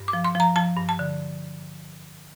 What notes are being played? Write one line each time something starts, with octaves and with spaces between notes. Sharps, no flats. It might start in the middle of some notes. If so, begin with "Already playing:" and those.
Already playing: G2
D6
F3
C6
F3 A#5
F3 A5
G2
A5
D3